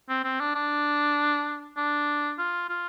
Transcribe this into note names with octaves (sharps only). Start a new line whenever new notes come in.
C4
C4
D4
D4
D4
F4
F4